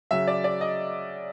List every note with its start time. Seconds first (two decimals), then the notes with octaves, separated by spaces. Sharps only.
0.11 C#3 F#3 E5
0.27 D5
0.44 D5
0.61 D#5